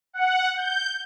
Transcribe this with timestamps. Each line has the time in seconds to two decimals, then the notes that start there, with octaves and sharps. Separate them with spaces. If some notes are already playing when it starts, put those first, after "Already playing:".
0.13 F#5
0.57 G6